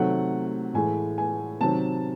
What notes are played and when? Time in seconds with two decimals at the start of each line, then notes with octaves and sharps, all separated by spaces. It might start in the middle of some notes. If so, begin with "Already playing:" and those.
Already playing: C3 D#3 F#3 A3 F#5
0.74 A2 E3 G#3 G#5
1.18 G#5
1.61 C3 D#3 F#3 A5